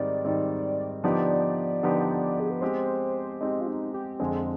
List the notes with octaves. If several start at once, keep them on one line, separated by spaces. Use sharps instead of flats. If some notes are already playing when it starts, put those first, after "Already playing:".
Already playing: G#2 D#3 G3 C4 D5
G#2 D#3 G3 C4
D3 F3 B3 D#4 G4 D5
D3 F3 B3 D#4 G4
G#4
B4
G#3 C4 G4 C5
G#3 C4 D#4 G4
F4
D#4
G4
F2 D3 G#3 C4 G#4